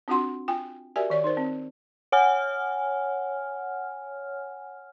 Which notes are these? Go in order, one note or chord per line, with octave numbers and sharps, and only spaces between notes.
C4 D4 F4 F#4 F#5 C6
F4 G5 G#5
F#4 G4 A#4 D5 E5 G#5
D#3 D5 C#6
D#4 A#4 C5
C4
C#5 F#5 G#5 F6